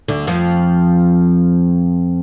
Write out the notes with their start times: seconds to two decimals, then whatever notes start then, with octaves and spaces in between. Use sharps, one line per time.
0.08 D2 D3
0.27 F2 F3